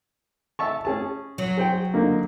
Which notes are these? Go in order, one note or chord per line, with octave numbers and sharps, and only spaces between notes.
E5 A5 C#6
C#4 G#4 A5
F#3
G#4 C5 G5
D3 A#3 D#4